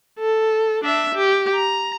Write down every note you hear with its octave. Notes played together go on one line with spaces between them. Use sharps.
A4
D4 E5
G4
A#5